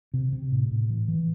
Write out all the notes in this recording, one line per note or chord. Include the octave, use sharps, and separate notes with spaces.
C3
C3
A2
A2
E3
E3